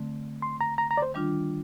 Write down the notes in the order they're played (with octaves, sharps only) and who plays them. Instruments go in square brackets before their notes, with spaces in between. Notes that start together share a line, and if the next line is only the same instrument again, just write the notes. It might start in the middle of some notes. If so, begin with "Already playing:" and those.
Already playing: [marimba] D3 A3 C4
[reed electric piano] C6
A#5
A#5
A#5
D5
C5
[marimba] D#3 G3 D4 F4